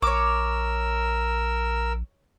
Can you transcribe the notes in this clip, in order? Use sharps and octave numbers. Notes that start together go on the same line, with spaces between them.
A#1 A#4 C#5 D6 E6